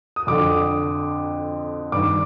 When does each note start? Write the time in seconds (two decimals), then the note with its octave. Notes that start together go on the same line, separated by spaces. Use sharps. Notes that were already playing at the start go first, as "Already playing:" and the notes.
0.16 D#6
0.27 F2 D3 D6
1.92 G2 D#3 D6